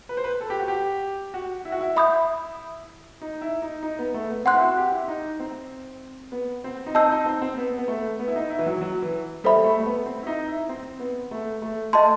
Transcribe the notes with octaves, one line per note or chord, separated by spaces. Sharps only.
B4
C5
B4
A4
G4
F#4
G4
F#4
E4
F#4
E4
E5 B5 D#6 G6
D#4
E4
D#4
D#4
B3
A3
B3
C4 F#5 C6 F#6
E4
F#4
G4
E4
D#4
C4
B3
C4
D#4
C4 D#5 A5 E6 G6
D#4
C4
C4
B3
B3
A3
B3
E4
D#4
E4
E3
F#3
F#3
E3
G3 A4 C5 E5 B5
A3
A3
B3
C4
E4
D#4
E4
C4
B3
A3
A3
A3 D#5 A5 C6